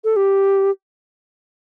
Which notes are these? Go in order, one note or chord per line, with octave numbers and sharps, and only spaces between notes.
A4
G4